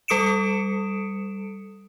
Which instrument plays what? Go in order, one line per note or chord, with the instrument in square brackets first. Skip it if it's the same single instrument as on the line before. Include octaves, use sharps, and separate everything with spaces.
[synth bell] G3 A4 D#6 C#7 D7 E7